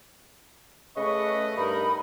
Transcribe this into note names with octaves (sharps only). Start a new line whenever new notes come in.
C#3 A3 B4 D#5 C#6
G2 D#4 A#4 B5